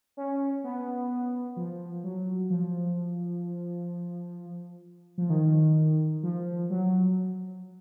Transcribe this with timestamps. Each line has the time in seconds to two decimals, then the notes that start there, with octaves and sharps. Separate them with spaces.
0.17 C#4
0.64 B3
1.57 F3
2.04 F#3
2.50 F3
5.18 F3
5.30 D#3
6.23 F3
6.70 F#3